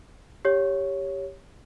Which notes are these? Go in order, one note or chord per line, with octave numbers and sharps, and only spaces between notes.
G4 C#5